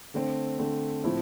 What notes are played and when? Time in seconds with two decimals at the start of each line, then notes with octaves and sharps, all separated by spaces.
0.14 D3 A3 C4
0.59 D3 A3 C4
1.04 A2 F3 A3 C4 E4